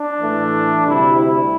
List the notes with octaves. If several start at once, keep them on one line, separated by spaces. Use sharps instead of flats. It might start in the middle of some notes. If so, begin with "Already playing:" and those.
Already playing: D4
A2 E3 A3
D2 C3 G3 E4
E4